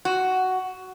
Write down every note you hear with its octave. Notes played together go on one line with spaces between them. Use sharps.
F#4